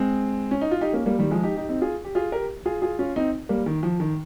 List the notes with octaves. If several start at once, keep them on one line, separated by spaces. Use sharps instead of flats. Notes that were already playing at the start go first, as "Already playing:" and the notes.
Already playing: G#3 C4
C#4
D#4
F4
D#4 G4
A#3 C#4
G3 A#3
D#3 G3
F3 G#3
D#4 G4
D#4 G4
C4 D#4
F4 G#4
G4
F4 G#4
G4 A#4
F4 G#4
F4 G#4
C#4 F4
C4 D#4
G3 A#3
D#3
F3
D#3